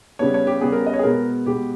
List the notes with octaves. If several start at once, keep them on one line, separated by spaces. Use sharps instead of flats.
C#3 G3 B3 C#5
C#5
G4
C#3 G3 B3 G#4
A#4
D#5
C#5
G#4
B2 G#3 B3 A#4
B2 G#3 B3 G4